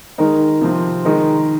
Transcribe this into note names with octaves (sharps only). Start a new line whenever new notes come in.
D#3 G#3 D#4 A#4
C3 F3 C4
D#3 G#3 D#4 A#4